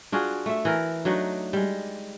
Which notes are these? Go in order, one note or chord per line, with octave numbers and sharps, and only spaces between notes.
D4 F4 F#4 G#4
A3 E5
E3 A#4
F#3 A3 D4 D#4
G3 G#3